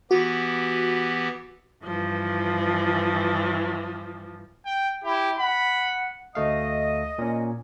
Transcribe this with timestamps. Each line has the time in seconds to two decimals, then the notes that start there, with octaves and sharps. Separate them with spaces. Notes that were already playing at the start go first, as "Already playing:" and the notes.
0.11 E3 B3 F#4 G4
1.84 G2 E3 F3
4.66 G5
5.04 E4 G4
5.38 F#5 B5
6.35 D2 A3 D#5 F5
7.18 A#2 C#4